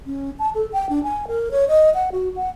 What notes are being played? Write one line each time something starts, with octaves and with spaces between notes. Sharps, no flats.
C#4
A5
A4
G5
D4
G#5
A#4
C#5
D#5
F#5
F#4
F#5